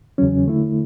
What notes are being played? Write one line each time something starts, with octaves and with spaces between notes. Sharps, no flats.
E2 C#3 F#3 C#4
D3 A3 E4